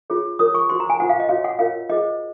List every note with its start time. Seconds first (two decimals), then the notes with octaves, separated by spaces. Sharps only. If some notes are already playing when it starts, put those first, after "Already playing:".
0.10 F4 G#4 C#5
0.39 F4 A#4 C#5 D#6
0.55 C#6
0.69 F#4 C5 C6
0.80 A#5
0.90 G#5
1.00 F4 C5 F#5
1.09 F5
1.20 D#5
1.29 F#4 C#5 F5
1.44 F#5
1.59 F4 A#4 C#5 F5
1.89 F4 G#4 C5 D#5